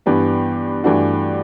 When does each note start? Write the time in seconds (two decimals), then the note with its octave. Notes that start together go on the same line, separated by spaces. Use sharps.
0.06 G2 E3 B3 D4 G4
0.84 G2 E3 A3 D4 F#4